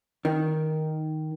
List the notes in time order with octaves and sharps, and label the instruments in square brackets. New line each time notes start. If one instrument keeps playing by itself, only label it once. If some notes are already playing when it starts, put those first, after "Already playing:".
[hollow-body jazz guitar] D#3